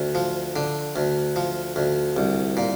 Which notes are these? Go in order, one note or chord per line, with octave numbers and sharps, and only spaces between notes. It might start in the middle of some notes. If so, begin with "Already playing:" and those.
Already playing: D2
F3
D3
D2
F3
D2
C2
A#2